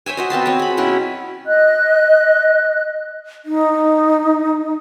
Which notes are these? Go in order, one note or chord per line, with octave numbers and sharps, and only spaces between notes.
C5 C#5 E5 G#5
F#4 C5 D#5
B3 C4 A5 C6
C4 C#5
G#4 B5
B2 F#3 C#4 E4
D#5 F#6
D#4